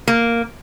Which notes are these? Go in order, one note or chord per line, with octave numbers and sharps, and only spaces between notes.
A#3